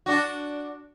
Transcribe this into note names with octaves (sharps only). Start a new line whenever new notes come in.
D4 F#4